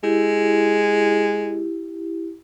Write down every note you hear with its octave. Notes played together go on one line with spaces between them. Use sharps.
G#3 E4 G4